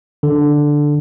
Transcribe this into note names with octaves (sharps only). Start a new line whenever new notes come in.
D3